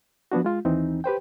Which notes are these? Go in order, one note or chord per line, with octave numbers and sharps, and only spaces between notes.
F3 B3 D4 F#4
G#3 F4
D#2 E3 C4 D#4
G4 B4 C5 G5